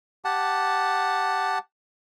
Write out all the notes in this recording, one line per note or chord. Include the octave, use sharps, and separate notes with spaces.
G4 F#5 A5